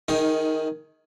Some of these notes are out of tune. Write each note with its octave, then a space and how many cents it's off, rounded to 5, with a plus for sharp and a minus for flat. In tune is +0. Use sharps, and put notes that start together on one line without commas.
D#3 +0 D#4 +25 G#4 +10